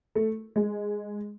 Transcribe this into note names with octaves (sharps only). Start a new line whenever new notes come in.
A3
G#3